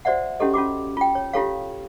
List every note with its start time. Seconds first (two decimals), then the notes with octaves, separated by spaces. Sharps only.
0.05 F#4 C5 D5 E5 F#5
0.40 C#4 E4 F#4 G4 A4 D#5
0.54 C#4 F4 F#4 D6
0.97 F4 G5
1.15 C#5
1.33 E4 F4 G4 A4 C#5 F5